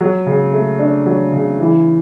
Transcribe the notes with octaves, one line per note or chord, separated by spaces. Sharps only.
F#3
C#3
A3
D4
F#3
C#3
E3